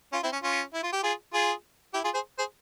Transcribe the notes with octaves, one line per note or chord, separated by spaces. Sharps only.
C#4 F4
C4 E4
C#4
C#4 F4
E4
F4
G4
F4 G#4
F4 G#4
E4 G4
F4 G#4
G#4 C5
G#4 C5